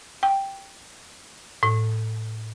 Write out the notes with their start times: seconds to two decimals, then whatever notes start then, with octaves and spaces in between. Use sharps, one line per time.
0.23 G5
1.63 A2